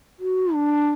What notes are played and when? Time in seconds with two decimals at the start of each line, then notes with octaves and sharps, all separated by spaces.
0.19 F#4
0.54 D4